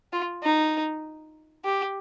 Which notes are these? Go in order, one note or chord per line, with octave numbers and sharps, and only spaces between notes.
F4
D#4
G4